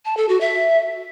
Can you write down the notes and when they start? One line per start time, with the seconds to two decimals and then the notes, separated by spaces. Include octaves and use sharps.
0.05 A5
0.17 A4
0.29 F#4
0.41 E5